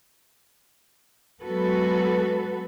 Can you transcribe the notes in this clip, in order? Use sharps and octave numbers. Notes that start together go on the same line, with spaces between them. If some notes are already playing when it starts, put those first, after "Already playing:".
F#3 G#3 B3 F#4 A4 B4